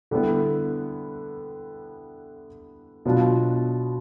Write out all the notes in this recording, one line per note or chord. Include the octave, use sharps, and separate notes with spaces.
D3 G3 B3 E4
B2 F#3 B3 D4 F4